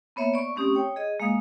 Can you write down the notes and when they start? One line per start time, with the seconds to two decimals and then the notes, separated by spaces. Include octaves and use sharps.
0.16 A#3 B3 C#5 E5
0.34 D5 C#6
0.56 A3 C4 C#4 G4 D#6
0.74 C#5 G5 D#6
0.96 G#4 D#5
1.20 G#3 A#3 F5 D#6